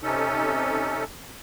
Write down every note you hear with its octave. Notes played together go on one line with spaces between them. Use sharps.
C3 C#4 D#4 A4